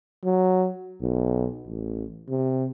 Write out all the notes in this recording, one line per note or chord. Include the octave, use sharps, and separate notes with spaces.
F#3
B1
A1
C3